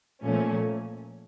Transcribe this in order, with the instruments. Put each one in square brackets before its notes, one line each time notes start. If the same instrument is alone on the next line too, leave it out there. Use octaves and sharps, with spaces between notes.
[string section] A#2 F3 A3 C#4